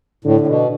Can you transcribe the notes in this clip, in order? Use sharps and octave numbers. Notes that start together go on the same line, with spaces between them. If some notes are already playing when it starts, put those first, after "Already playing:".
A2 D3
A2
B2